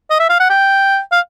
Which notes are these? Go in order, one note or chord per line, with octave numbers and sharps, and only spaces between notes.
D#5
E5
F5
F#5
G5
F5